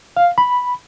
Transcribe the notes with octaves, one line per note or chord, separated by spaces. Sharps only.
F5
B5